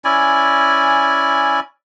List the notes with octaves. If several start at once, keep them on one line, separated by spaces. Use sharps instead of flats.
C#4 E4 D5 G#5